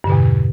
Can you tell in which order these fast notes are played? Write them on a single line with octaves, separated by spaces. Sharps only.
G2 D3 B2 E2